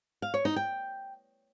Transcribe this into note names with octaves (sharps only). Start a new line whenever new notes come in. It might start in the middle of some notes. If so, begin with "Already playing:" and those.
F5
C#5
D#4
G5